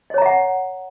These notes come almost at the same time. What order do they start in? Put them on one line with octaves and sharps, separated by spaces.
D#5 C#5 A#5 E5 F#5